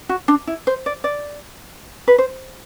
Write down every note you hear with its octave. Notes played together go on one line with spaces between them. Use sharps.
F#4
D4
E4
C5
D5
D5
B4
C5